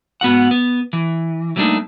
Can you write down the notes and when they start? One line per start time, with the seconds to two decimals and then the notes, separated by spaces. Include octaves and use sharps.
0.21 G#2 B3 F#4 F#5
0.51 B3
0.93 E3
1.56 F#3 G3 A3 A#3 D4 D#4